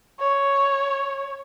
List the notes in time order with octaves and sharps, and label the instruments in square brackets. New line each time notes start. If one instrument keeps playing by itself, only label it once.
[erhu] C#5